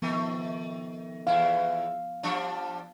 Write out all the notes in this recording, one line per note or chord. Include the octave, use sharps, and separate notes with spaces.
D#3 F3 A3 B3
E2 E4 F5
F3 G3 D4